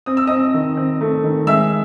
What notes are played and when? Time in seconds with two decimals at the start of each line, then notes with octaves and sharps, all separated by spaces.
0.06 C4 D#6
0.17 E6
0.27 C4 D#5 D#6
0.54 D#3
0.77 C4
1.01 A3
1.24 D#3
1.47 G#3 E5 E6